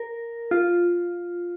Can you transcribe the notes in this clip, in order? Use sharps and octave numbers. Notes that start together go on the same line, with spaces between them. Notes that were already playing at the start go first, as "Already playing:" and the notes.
Already playing: A#4
F4